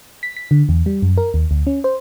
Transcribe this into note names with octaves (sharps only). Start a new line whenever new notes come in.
B6
B6
D3
E2
G3
F#2
A#4
D#2
D2
C#4
C5